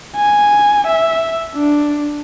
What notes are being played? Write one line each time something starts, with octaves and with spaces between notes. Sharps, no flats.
G#5
E5
D4